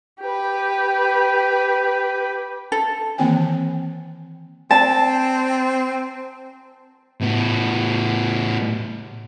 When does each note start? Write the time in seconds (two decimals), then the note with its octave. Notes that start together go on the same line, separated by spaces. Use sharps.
0.21 G4 B4
2.72 A4
3.18 D#3 E3 A#3 C4 G5 G#5
4.71 C4 A5
7.21 A2 B3